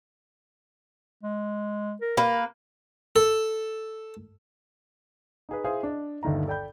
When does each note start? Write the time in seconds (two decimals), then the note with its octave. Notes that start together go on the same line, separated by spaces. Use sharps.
1.23 G#3
2.01 A#4
2.17 A#3 A#4 B4
3.16 A4
5.49 D#4 G#4 B4
5.64 E4 G#4 C5 E5 F5
5.83 D4 D#5
6.23 G1 D#2 D3 D#3 E5 A#5
6.47 A4 D5 G5 B5 G6